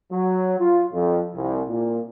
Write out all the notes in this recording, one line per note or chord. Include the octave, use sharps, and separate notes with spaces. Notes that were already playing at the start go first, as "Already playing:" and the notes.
F#3
F4
F2
C2
A#2